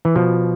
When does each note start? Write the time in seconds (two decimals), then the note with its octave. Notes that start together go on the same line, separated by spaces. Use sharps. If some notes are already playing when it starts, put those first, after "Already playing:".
0.05 E3
0.15 B2 F3